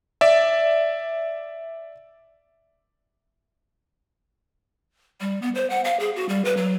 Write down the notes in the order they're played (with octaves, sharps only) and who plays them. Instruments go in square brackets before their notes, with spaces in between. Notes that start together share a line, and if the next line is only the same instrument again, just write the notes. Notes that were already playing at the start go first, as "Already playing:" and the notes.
[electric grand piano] D5 E5
[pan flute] G3
B3
C5
F#5
F5
G#4
F#4
G3
B4
F#3